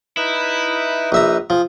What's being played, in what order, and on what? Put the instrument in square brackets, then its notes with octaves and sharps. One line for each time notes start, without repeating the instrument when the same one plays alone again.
[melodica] D#4 B4 D#6 [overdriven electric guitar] E4
[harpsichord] A#1 E5 A#5
[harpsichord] F3 [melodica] G#4